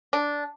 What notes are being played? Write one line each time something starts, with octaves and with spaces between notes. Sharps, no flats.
D4